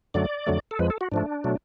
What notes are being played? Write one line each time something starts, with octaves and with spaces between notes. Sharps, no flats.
F#2 D3 F#3 A3 D5
F2 D3 F#3 A3
A4
F2 F3 G#3 B4
A4
F#4
G#2 F3 A3 D4
B2 F#3 A3